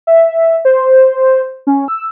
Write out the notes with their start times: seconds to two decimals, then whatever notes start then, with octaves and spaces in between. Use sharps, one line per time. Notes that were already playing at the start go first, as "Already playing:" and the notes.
0.07 E5
0.65 C5
1.67 C#4
1.88 E6